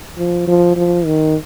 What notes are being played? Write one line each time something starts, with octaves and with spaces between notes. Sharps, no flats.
F3
F3
F3
D#3